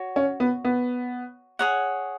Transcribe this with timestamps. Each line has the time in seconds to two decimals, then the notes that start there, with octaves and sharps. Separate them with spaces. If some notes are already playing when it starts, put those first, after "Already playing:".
Already playing: F#4 C#5
0.16 C#4
0.40 B3
0.65 B3
1.59 G#4 C#5 F#5